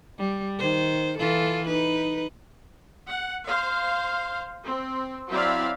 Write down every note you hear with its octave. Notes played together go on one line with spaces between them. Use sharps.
G3
D#3 C5
E3 F4 A4
D#4 B4
F#5
C5 F5
C4
F#3 C4 E4 D5 E5 F5